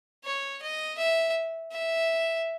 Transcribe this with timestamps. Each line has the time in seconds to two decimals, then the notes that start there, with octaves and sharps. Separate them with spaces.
0.24 C#5
0.62 D#5
0.98 E5
1.72 E5